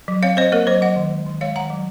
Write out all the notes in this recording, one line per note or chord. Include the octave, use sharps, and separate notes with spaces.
F#3
C4 C#5 F5
C4 C5 D#5
A#3 A#4 C#5
F#3 C5 D#5
F#3 D#5 F#5
D#3
G#3
D#3
G#3 C#5 F5
D#3 F#5 A#5
F#3